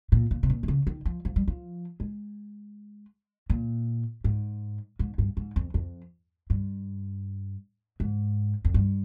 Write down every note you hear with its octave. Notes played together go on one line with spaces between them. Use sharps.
A#2
A#2
C3
A#2
D#3
C#3
D#3
F3
F3
G3
F3
G#3
A#2
G#2
G#2
G2
G#2
F2
F2
G2
G#2
F2
G2